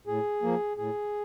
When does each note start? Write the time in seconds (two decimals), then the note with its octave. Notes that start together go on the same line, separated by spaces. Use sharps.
0.07 A2 G#4
0.42 F3 A#3
0.77 A2 G#4